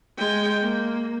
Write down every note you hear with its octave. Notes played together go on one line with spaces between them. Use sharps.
G#3 G5
A#3